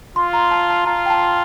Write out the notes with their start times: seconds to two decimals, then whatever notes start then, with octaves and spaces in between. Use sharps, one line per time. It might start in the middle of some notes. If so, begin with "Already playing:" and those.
0.16 F4 C6
0.33 A#5
0.51 A5
0.69 A5
0.86 F4 A#5
1.06 G5
1.10 A5